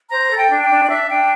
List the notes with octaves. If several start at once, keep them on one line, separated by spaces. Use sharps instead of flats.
C5 A#5
A4
G5
D4
G5
D4
D5
D4 E5
D4 G5